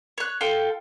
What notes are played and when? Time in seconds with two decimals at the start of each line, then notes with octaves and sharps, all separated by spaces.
0.18 C#5 F#6
0.41 F4 A4 G5